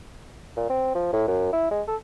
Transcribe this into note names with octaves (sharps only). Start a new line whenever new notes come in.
A#2
C4
F3
A2
F#2
E4
G#3
A4